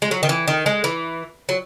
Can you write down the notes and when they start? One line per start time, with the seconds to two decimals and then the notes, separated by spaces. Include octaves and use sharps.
0.02 G#3
0.11 F#3
0.23 D#3
0.29 E3
0.48 D#3
0.66 G#3
0.84 E3
1.49 F#3